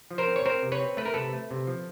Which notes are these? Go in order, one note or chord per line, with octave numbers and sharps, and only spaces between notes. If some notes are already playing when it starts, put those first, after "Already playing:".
F3
A#4 C5
C4
C#5
C4 A#4 C5
C3
B4 C#5
C4
A3 B4
A#4
C3 A4 B4
A3
C3
F3